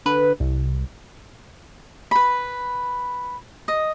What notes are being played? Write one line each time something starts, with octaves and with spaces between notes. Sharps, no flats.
D3 B4
C2
B4 B5
D#5